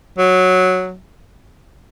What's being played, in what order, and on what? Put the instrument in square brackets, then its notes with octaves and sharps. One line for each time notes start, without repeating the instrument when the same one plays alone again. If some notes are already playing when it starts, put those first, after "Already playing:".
[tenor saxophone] F#3